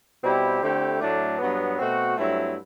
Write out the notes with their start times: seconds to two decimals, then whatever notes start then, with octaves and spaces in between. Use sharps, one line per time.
0.23 B2 G3 C4 E4 G4
0.61 D3 A3 C4 E4 G4
1.00 A2 F#3 A3 D4
1.38 G2 F#3 B3
1.78 B2 A3 C4 F#4
2.17 G2 F#3 A3 C4 E4